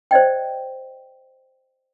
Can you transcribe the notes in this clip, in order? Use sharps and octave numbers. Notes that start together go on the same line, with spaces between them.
C5 D5 D#5 G5